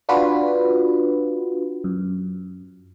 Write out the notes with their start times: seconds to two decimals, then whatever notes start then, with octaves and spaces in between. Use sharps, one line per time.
0.09 D4 F4 F#4 B4
1.84 F#2